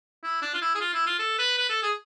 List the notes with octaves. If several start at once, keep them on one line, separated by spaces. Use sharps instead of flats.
E4
D4
F4
E4
G#4
F4
E4
F4
A4
B4
B4
A4
G#4